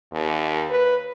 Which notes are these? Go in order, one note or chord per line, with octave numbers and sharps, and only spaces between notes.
D#2
B4